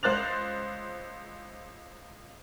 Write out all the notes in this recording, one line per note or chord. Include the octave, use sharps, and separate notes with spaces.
C#2 C5 F#6 A6 F7